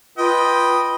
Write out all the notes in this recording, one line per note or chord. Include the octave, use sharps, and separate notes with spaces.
F4 B4 D#5 G5